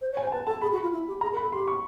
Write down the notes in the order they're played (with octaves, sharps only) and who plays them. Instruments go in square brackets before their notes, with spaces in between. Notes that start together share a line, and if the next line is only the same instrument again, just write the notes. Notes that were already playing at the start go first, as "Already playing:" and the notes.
[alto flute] C5
C#5
[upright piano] G#5
[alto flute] C5
[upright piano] G#5
[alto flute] B4 [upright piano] A5
[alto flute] A4 [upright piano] A5
[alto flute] G#4 [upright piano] B5
[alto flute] F#4
[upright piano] B5
[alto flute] F4
E4
G4
[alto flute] G#4 [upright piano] A#5
[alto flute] A#4
[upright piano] B5
[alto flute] A4
[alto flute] G4 [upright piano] C6
[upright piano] C#6